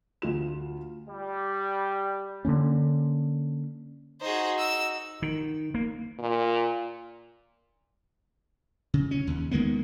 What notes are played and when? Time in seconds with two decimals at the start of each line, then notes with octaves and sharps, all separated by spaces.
0.22 D2 F4 E7
1.09 G3
2.45 D3 E3 A#3 C#4
4.21 D#4 F#4 G#4 C5
4.59 E6
5.22 D#3
5.74 A#3
6.19 A#2
8.94 C#3
9.11 C#4
9.27 D#2
9.51 D#3 G#3 A#3 B3